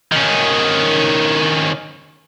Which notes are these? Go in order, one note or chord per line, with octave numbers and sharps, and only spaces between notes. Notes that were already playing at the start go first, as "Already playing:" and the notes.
D#3 C#4